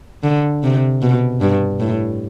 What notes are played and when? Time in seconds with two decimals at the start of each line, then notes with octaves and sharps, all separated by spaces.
0.23 D3
0.63 C3
1.02 B2
1.41 G2
1.80 A2